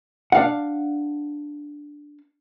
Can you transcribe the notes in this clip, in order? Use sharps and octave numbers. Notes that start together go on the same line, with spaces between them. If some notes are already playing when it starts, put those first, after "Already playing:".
D4 F5 F#5